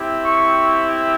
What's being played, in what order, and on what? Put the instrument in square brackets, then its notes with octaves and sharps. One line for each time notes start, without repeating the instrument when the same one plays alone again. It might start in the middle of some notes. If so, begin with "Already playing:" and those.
Already playing: [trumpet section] C4 E4 G4
C#6